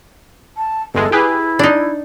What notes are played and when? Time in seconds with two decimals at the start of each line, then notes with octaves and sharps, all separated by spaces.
0.57 A5
0.94 G1 E2 G#3 A4
1.12 E4 G4 G#4 B4
1.59 D4 D#4